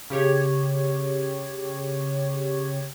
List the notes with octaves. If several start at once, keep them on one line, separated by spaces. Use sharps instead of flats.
C#3 G4 C#5